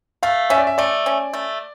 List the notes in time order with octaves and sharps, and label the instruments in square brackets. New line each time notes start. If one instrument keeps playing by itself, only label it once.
[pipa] A3 [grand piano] F5
[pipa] C#4 [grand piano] E5
[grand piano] D5
E5
[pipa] A3 [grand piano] D5
[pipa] C#4
A3